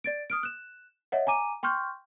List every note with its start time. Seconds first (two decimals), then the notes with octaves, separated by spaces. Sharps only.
0.04 D5 A6 D7
0.30 D#6 F6 D7
0.43 F#6 E7
1.12 C#5 D#5 E5 F#5
1.27 G#5 A#5 D6 D#7
1.63 G5 C6 C#6 F6 G6